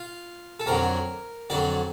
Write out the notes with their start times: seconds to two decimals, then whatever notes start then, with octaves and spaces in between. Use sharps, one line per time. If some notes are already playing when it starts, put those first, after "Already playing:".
Already playing: F4
0.60 A4
0.66 F2 D3 F#3 A#4
1.50 F2 D3 F#3 D5